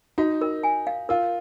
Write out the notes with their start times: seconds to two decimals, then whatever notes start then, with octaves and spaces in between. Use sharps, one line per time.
0.18 D#4 F#4
0.41 A#4
0.63 G#5
0.87 F5
1.09 F4 A#4